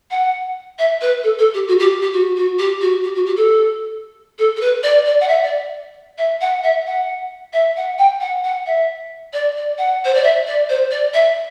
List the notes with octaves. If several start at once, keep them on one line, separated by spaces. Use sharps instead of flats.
F#5
E5
B4
A4
A4
G4
F#4
G4
G4
F#4
F#4
G4
F#4
G4
F#4
G4
A4
A4
A4
B4
D5
D5
F#5
E5
D5
E5
F#5
E5
F#5
E5
F#5
G5
F#5
F#5
E5
D5
D5
F#5
C5
D5
E5
D5
C5
D5
E5